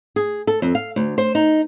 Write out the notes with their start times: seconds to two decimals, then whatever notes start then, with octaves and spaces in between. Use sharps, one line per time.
0.16 G#4
0.47 A4
0.62 F2
0.75 F5
0.96 D2
1.18 C5
1.35 D#4